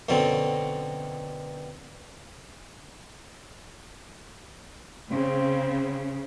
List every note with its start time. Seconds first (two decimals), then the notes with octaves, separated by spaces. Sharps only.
0.09 F#2 B2 D3 F#3 C4
5.11 C#3 C4